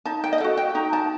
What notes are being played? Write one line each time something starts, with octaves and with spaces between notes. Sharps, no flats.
D#4 A5
G5
D#5
F#4 A4 F#5
G5
D#4 A#5
A5